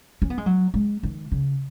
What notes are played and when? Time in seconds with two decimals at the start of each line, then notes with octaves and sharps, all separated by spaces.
0.22 C#4
0.30 B3
0.38 G#3
0.46 F#3
0.74 G#3
1.03 D#3
1.32 C#3